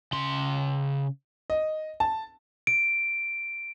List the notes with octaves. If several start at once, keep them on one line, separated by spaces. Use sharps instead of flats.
C#3 C6
D#5
A5
D7